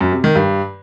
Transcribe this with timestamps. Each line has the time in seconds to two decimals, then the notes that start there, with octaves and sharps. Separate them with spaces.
0.01 F#2
0.12 C3
0.24 D#3
0.35 G2